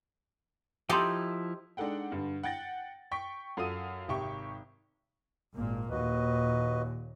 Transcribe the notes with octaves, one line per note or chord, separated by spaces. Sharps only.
F3 D#4 E4 G4 A4 E5 C6
G#3 D4 D#4 A4 F#5 G5
G2 D3
F#5 G5 A6 A#6
G5 C#6 B6
F#2 F4 A4 F5 D#6 D#7
G#1 C3 G4 E5 C#6
G#1 A#2 A#3
D#2 A#2 F#4 B4 D#5